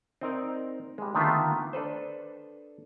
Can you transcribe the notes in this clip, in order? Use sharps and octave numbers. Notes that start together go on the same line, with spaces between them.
C4 D#4 A#4 D5
G3 G#3
D3 D#3 A3 B3 F4 E5
D4 A4 B4 C5